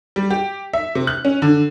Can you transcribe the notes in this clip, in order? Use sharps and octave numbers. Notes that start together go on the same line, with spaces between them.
G3
G4
E5
C3
F#6
C#4
D3